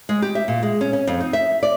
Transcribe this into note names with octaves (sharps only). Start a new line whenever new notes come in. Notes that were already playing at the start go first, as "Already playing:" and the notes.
G#3
G4
E5
A#2
G#3
C#4
C#4
F2
D#4
E5
D5